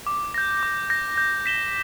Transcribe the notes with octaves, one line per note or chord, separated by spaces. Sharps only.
D6
G6 A#6
D6
G6 A#6
G6
B6 E7 G7